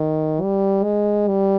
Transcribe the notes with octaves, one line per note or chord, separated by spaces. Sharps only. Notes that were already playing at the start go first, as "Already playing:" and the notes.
Already playing: D#3
G3
G#3
G3